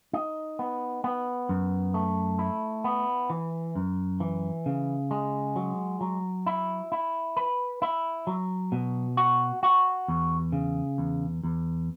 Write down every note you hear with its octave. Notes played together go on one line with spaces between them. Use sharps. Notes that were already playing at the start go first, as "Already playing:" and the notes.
D#4
B3
B3
F#2
A3
E4
B3
E3
F#2
E3
C#3
G#3
F#3
F#3
E4
E4
B4
E4
F#3
B2
F#4
F#4
E2
C#3
E2
E2